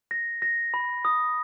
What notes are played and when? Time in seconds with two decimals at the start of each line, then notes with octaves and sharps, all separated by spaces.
0.11 A#6
0.42 A#6
0.74 B5
1.05 D#6